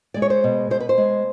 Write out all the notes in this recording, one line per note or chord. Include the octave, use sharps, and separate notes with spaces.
G#3 D5
C#5
C5
B2
B2 C5
B4
C5
G#3